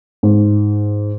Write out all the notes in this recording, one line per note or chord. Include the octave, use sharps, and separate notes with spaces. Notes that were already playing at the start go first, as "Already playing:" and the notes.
G#2